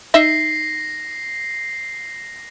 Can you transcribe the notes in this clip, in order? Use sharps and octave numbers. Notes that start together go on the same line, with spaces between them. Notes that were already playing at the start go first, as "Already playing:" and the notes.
D#4 D#5 E5 A#6 C7